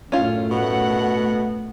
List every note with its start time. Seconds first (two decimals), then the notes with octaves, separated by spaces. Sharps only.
0.12 F#2 A2 C#4 F4
0.51 B2 A3 F#5